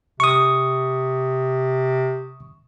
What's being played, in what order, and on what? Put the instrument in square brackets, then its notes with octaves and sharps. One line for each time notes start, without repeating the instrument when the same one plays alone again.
[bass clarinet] C3 [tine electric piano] C#6 D#6